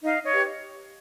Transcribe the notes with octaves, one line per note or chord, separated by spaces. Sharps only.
D#4 D#5 F5
C#5 D#5
G4 B4